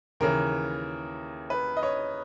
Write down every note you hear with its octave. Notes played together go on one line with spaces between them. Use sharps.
D#2 C#3 E3 A#4
B4
D#5
C#5